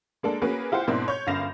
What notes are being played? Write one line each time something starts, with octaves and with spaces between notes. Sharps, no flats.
G#3 A#3 D4 A4
A#3 C#4 F#4 G#4 B4
E4 F4 G4 C5 F#5
G#2 B2 A#3 C4 D4 E4
C#5 C#6 G6
G1 F#2 F5 A#6 E7 F7